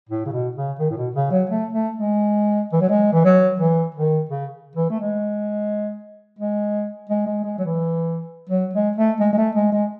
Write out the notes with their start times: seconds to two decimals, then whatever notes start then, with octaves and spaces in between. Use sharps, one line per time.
0.09 A2
0.26 C#3
0.32 B2
0.55 C#3
0.79 D#3
0.90 A2
0.97 B2
1.14 C#3
1.31 F#3
1.49 A3
1.72 A3
1.96 G#3
2.73 E3
2.81 F#3
2.90 G#3
3.13 E3
3.24 F#3
3.60 E3
3.95 D#3
4.29 C#3
4.76 E3
4.90 A3
5.00 G#3
6.39 G#3
7.09 G#3
7.27 G#3
7.44 G#3
7.58 F#3
7.61 E3
8.49 F#3
8.74 G#3
8.96 A3
9.20 G#3
9.33 G#3
9.37 A3
9.55 G#3
9.72 G#3